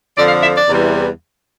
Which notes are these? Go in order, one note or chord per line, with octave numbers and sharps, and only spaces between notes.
F2 D3 F3 D5
F5
E5
D5
E2 C3 E3 G3